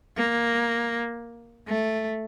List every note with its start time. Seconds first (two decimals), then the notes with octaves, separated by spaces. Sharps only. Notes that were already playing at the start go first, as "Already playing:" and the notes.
0.17 A#3
1.68 A3